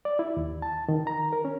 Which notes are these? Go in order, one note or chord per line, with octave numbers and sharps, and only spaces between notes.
D5
E4
D#2
A5
D#3
A#5
A#4
C#4